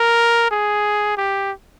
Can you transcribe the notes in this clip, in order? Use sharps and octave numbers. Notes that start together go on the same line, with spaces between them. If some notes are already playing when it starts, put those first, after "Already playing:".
Already playing: A#4
G#4
G4